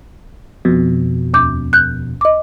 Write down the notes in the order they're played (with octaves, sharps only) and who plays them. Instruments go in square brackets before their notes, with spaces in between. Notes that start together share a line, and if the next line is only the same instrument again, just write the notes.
[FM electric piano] F2 B2
[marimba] D#2 D6 G6
F#6 G6
D#5 D6